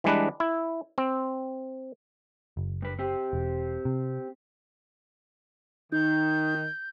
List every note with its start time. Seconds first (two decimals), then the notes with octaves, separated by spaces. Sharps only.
0.04 E3 G3 G#3 D4 B4
0.40 E4
0.98 C4
2.57 F#1
2.82 G2 B4
2.99 C4 G4
3.33 E1
3.85 C3
5.92 D#3 D#4 G6